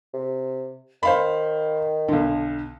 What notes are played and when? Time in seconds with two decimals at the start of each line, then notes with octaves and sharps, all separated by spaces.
0.14 C3
1.03 D#3 C5 F5 B5
2.08 B1 D3